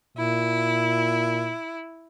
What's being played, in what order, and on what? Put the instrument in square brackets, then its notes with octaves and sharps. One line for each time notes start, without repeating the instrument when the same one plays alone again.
[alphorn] A#2 [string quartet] E4